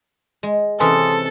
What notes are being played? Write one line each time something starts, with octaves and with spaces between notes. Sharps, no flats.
G#3
C3 E3 C#4 A4 G#5 C6 D#6